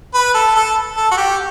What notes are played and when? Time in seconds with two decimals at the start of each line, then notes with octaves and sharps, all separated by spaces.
0.14 B4
0.34 A4
0.55 A4
0.97 A4
1.11 F#4
1.17 G4